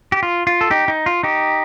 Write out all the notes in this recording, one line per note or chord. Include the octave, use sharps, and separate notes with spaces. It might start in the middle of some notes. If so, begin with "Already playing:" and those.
G4
F4
F4
A4
D#4 G4
D#4
F4
D#4 G4